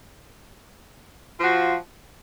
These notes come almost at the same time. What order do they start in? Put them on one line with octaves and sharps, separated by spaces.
F4 F3 F#4